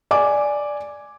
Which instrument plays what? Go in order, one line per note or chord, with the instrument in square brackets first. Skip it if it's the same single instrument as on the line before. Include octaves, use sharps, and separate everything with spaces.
[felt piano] D5 G#5 D6